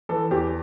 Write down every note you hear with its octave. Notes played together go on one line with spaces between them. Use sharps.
E3 A4
E2 G4